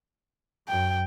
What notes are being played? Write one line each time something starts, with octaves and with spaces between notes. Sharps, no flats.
F#2 G5